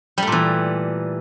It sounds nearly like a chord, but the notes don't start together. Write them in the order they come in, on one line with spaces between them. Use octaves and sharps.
G3 A3 A#2 E3